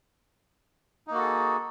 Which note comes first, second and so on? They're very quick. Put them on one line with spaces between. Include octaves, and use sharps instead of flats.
D#4 A#3 F#4 A4 G#4